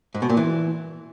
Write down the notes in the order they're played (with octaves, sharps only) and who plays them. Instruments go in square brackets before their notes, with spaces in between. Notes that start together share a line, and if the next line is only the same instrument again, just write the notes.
[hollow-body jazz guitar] G#2
B2
A#2
E3